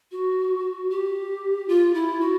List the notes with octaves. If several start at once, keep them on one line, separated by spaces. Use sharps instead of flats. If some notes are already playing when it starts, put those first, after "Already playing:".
F#4
G4
F4
E4
F#4